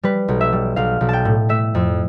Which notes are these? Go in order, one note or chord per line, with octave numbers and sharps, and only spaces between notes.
G3 B4
B1
E5
G3
B1 F5
B1
G5 A5
A2
A3 E5
F2